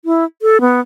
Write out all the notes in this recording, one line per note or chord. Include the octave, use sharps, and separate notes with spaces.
E4
A4
B3